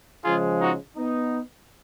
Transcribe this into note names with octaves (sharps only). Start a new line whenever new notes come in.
C#3 F3 G#3 F4 G#4
D#4 F#4
B3 D#4